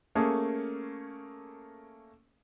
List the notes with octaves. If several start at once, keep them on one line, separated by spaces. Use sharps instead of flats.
A3 A#3 C#4 G#4